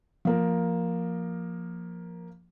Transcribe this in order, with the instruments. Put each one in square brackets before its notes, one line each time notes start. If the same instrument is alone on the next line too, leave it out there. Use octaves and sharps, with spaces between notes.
[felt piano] F3 A#3 A#4